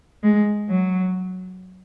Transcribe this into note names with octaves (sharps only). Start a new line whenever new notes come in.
G#3
F#3